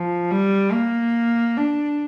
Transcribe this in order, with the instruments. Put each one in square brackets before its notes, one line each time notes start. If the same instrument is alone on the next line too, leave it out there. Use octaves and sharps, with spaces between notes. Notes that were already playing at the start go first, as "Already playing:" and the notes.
Already playing: [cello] F3
G3
A#3
D4